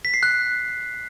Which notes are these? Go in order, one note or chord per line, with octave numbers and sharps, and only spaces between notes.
B6
C7
F#6